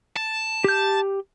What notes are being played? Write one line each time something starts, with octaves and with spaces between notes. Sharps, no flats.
A5
G4 G6